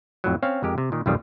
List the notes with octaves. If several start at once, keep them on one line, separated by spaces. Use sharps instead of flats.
F2 A2 F#3
C4 C#4 C#5 F5
F2 G#3 G4 A#4
C3
A#2 D#3
B1 F2 G#2 D#3 G3 F4